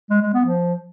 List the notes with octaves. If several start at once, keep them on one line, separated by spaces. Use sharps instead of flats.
G#3
G#3
B3
F3